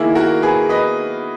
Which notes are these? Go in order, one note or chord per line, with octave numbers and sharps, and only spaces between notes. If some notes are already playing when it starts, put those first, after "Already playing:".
Already playing: D#3 A#3 E4 G#4
F#4 A#4
G#4 B4
B4 D#5